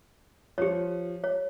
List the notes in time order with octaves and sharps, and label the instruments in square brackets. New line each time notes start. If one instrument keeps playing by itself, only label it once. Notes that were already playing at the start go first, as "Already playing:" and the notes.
[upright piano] F3 [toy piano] G4 C#5
[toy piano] C#5